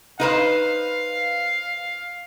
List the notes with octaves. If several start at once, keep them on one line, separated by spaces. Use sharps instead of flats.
D#4 B4 C5 F5